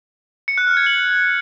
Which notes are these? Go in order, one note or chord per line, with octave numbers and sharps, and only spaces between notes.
C#7
F#6
F6
G#6
F#7